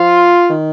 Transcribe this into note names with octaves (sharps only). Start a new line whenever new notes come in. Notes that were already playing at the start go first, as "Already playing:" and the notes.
Already playing: F3 F4
D#3